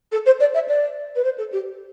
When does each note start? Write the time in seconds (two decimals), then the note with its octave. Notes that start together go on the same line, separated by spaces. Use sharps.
0.12 A4
0.26 C5
0.40 D5
0.54 E5
0.68 D5
1.15 B4
1.24 C5
1.38 A4
1.52 G4